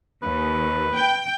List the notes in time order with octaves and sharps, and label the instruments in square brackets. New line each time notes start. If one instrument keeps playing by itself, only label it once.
[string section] D#2 [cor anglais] B4
[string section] G5